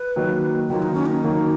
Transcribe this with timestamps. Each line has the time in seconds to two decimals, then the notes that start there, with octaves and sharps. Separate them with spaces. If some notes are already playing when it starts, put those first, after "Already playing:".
Already playing: B4
0.16 D#3 F#3 A#3
0.70 D#3 F#3 A#3 F4
0.82 D#4
0.94 C#4
1.06 D#4
1.24 D#3 F#3 A#3